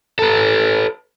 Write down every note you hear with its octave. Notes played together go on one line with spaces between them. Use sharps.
A4 B4